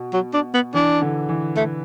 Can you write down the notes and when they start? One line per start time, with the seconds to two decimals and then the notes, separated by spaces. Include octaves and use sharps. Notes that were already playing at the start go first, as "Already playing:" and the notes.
Already playing: B2
0.13 F#3
0.34 D4
0.54 B3
0.74 E3 D4
1.02 D3
1.29 E3
1.56 A3